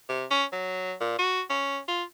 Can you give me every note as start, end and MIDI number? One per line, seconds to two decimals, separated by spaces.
0.09 0.25 48
0.31 0.44 61
0.53 0.94 54
1.01 1.15 46
1.19 1.41 66
1.50 1.80 61
1.88 2.04 65